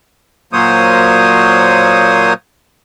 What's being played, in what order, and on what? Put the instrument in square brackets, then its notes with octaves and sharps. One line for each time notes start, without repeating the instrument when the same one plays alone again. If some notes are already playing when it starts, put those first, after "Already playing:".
[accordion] A#2 F#3 A#3 C5 C#5 D#6